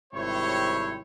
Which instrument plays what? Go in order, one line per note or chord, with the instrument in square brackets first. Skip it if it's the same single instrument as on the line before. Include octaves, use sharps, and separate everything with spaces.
[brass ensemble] G#1 C3 G3 E4 C5 C#5